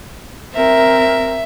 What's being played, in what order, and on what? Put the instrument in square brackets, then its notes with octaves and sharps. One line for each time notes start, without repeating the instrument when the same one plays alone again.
[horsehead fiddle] C4 A#4 [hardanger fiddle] E5